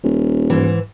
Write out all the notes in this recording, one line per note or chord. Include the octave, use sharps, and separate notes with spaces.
D#1
G#2 E3